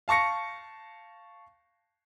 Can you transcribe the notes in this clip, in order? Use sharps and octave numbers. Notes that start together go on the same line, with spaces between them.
F5 A5 C#6 A#6 C#7